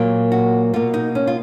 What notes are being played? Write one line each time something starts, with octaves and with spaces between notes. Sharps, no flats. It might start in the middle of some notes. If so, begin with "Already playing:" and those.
Already playing: A#2 F#3 A#3
F#4
B2 A#3 F4
D#4
C#4
F4